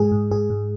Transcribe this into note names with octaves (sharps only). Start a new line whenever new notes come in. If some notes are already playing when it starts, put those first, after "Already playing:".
Already playing: G#2 G#3 G#4
G#2
G#2 G#4
G#2